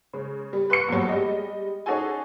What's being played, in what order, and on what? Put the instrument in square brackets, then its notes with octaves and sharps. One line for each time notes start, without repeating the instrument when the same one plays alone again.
[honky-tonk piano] C#3 G#3
G3
B4 C6 C#6 C#7
A#1 E2 G2 F#3
G3 G#3 D#5
C#4 D#4 F#4 G#4 A4 G#5